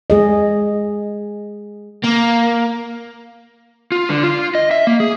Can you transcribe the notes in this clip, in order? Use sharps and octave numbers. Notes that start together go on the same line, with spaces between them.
G#3 G#4 D#5
A#3
F4
D3
F4
D#5
E5
A#3
G#4